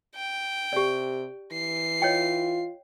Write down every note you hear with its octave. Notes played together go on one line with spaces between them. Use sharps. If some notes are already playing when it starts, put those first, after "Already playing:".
G5
C3 G4 D5
E3 C7
F4 C#5 D#5 G5